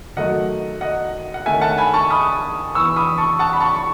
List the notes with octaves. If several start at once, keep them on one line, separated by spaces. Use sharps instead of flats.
D#3 F#3 A3 D#5 F#5
D#5 F#5
F#5
D#3 A3 C#4 E5 G#5
F#5 A5
G#5 B5
A5 C#6
B5 D#6
E3 B3 C#6 E6
B5 D#6
A5 C#6
F#5 A5
B5
A5 C#6
C#6